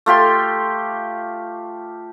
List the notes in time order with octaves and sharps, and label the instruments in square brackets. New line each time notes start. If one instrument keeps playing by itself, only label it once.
[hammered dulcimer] A3 F4 G4 C6